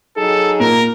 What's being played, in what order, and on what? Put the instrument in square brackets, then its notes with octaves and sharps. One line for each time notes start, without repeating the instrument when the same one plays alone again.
[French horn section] F#3 D#4 G#4 [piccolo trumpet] A4
[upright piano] A#2 [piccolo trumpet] A#4